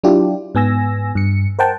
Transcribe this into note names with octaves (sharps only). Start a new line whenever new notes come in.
F#3 D4 E4 F4 G4
G#2 B3 G#5 E6 A#6
G2 C#7
A#4 C5 F#5 G5 A5